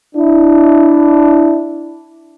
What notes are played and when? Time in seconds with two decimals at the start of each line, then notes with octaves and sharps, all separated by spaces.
0.16 D4 E4